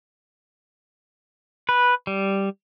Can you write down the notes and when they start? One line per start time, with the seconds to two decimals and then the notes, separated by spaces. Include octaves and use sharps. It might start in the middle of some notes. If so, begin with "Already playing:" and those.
1.69 B4
2.07 G3